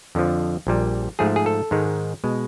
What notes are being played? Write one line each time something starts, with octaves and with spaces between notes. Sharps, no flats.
F2 D3 F3
A#1 A#2 G3
G#2 F3 A3 G#4
G#4
A4
G#2 D#3 G#3
B2 G#3